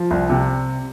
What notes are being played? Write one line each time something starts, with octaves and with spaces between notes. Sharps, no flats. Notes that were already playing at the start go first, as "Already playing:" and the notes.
Already playing: F3
C2
C3